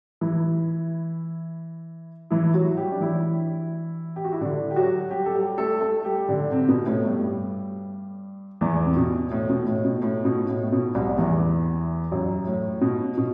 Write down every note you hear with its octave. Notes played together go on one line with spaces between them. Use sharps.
E3 E4
E3 E4
F#3 F#4
G3 G4
D4
E3 E4
G4
F#4
E4
D3 D4
G4
F#3 F#4
G3 G4
A4
G3 G4
A3 A4
A3 A4
G3 G4
D3 D4
C3 C4
B2 B3
A2 A3
G2 G3
E2 E3
C3
B2
A2
B2
A2
B2
A2
B2
A2
A2
B2
C2 C3
E2 E3
F#2 F#3
A2
B2
B2